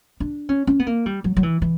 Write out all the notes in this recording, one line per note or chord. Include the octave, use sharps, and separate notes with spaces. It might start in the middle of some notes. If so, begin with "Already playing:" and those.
D4
C#4
C#4
B3
A#3
G3
F#3
F#3
E3
E3